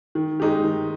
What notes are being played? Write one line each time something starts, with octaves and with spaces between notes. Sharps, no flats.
D#3
G#3 D#4 G4
D#3